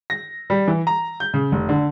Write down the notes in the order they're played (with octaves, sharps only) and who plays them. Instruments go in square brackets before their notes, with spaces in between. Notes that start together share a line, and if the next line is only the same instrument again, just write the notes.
[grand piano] A#6
G3
E3
A#5
G6
C#3
F1
D3